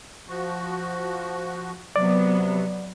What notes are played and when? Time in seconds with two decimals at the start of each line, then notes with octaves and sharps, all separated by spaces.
0.28 F3 F#4
1.96 C3 F#3 B3 D5